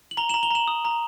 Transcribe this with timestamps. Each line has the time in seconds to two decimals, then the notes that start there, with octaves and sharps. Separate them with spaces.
0.11 F#7
0.17 A#5 F7 G7
0.29 E7 F#7
0.34 A#5
0.43 F7 G7
0.51 A#5 E7 F#7
0.68 D#6
0.85 A#5